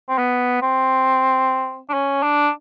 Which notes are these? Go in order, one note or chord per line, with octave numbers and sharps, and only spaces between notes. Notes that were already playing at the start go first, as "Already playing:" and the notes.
C4
B3
C4
D4
C#4
D4